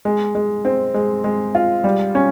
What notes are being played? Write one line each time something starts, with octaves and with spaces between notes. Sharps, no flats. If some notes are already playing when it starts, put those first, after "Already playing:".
G#3
G#3
C4
G#3
G#3
F4
G3
C#4